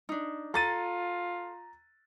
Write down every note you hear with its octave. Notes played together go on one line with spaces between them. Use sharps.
D4 D#4
F4 A4 A#5 A6 D#7